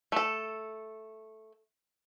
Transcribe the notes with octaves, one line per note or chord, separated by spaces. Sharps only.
A3 A4